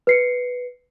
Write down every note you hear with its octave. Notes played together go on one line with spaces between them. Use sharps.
B4 C7 C#7